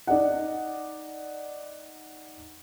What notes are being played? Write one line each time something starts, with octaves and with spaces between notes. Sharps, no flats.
D#4 D5 D#5 F#5